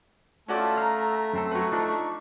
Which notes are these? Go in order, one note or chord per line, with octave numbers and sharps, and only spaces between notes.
A3 C#4 F4 F#4 D5 A5
F5 A#5
F#2 C4 A4
F#3 B4 C#6
F3 D4 D#4